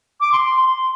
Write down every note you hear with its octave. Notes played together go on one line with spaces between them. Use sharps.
D6
C6
C6